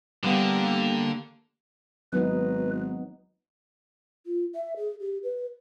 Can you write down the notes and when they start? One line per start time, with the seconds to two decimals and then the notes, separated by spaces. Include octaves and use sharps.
0.24 D3 G3 A#3 B3 G4 F5
2.13 G#1 F#3 B3 D#4 B4
4.26 F4
4.55 E5
4.76 G#4
5.00 G4
5.23 B4